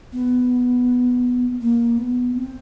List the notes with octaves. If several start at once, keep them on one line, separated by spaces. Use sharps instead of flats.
B3
A#3
B3
C4